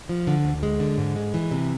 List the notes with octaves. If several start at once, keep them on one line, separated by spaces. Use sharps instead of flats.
F3
D3
D2
G#3
D3
G#2
G#3
E3
C3